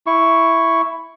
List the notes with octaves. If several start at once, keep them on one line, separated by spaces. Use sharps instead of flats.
E4 C#6